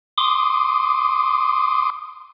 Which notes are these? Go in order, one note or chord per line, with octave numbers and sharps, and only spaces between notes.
C6 D6 D#6